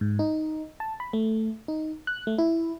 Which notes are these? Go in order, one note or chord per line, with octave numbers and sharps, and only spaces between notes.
G#2
D#4
A5
B5
A3
D#4
F#6
A3
E4